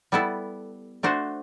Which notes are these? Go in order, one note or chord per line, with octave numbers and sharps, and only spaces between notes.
G3 B3 E4 A4
A3 D4 F#4 C5